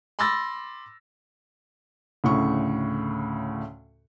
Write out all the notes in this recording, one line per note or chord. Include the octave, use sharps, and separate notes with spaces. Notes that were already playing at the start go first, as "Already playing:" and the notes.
B5 C6 D6 E6 A6 A#6
D2 A2 C#3 C#6